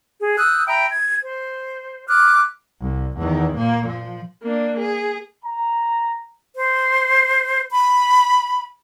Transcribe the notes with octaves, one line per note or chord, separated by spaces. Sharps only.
G#4
D#6 E6 F#6 G6
E5 G5 A#5 B5
G#6
C5
D6 F6 F#6
C2
E2 D#3
A#2 A#3
F3
A#3 D4
G#4
A#5
C5
B5